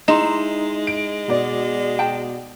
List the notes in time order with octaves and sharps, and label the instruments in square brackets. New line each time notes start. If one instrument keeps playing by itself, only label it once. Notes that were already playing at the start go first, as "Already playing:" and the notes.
[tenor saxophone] G#3 [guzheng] D#4 [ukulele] E4 D#5 [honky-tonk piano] C6 E7
[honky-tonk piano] D7
B2 D5
[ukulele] G5 A5